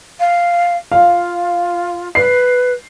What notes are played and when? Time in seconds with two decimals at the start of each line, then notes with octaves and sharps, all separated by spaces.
0.20 F5
0.92 F4 F5
2.15 B4 C7